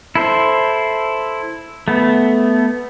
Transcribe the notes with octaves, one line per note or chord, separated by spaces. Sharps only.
E4 A4 C5
A3 B3